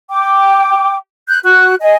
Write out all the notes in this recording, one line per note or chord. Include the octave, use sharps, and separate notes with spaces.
G5 D6
F#6 G6
F#4 F#6
D#5 G#5